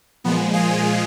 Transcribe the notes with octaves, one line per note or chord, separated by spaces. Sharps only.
A#2 F3 G#3 B3
F4 G#4